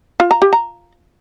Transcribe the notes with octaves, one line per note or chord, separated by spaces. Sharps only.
F4
A#5
G4
A#5